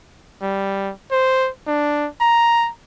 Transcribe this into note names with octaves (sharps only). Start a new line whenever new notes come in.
G3
C5
D4
A#5